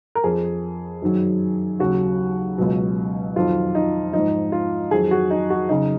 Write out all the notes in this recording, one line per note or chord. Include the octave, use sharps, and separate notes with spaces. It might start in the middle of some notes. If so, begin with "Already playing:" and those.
A#4
F2 F3 G#4
F#2 D#3 F#3
D#2 C#3 F#3 F#4
C#2 B2 F#3
F2 D#3 F#3 F4
D#4
F3 D#4
G#2
F4
F2 D#3 F#3 G#4
F#4
D#4
F#4
C#3 F#3 D#4